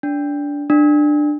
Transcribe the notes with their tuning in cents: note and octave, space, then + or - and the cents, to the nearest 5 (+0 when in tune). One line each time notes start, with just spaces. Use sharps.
D4 -20
D4 +15